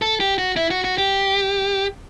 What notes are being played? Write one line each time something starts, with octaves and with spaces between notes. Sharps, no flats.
A4
G4
F#4
E4
F#4
F#4
G4